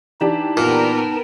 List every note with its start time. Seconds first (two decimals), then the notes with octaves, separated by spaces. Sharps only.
0.21 E3 D4 D#4 G4 A5
0.57 A#2 B3 A#4 G5